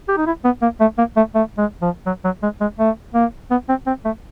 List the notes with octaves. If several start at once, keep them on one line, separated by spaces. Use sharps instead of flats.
G4
D#4
E4
B3
A#3
A3
A#3
A3
A3
G#3
F3
F#3
F#3
G#3
G#3
A3
A#3
B3
C4
C4
A3